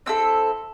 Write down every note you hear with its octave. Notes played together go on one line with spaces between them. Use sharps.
C4 E4 A4 E6